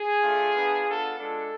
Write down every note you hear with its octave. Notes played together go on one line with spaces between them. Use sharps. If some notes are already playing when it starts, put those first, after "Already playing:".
Already playing: G#4
A3 D4 F4
B3 D4 F4
B3 D4 F4 A4
G#3 D4 F4 A4